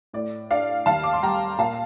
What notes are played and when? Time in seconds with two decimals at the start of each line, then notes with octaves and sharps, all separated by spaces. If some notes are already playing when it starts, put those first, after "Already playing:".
0.13 A2 D5
0.50 D4 D5 F5
0.86 D#2 F5 A5
1.03 D6
1.13 C6
1.23 G3 G5 A#5
1.58 A#2 F5 A5